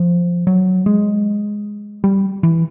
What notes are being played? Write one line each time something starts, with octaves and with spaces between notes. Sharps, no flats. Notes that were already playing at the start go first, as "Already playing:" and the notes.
Already playing: F3
F#3
G#3
G3
E3